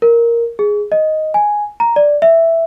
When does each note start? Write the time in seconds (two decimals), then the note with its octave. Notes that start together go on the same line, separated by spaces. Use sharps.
0.02 A#4
0.59 G#4
0.92 D#5
1.34 G#5
1.80 A#5
1.96 D5
2.22 E5